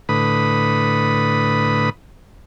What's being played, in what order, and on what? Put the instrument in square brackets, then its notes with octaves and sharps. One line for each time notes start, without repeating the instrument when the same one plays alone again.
[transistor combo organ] A2 D3 B4 B5 D#6